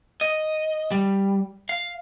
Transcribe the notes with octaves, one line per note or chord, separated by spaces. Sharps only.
D#5
G3
F5